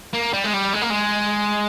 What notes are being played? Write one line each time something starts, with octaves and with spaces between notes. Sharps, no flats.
A#3
G3
G#3
G3
G#3
A#3
G#3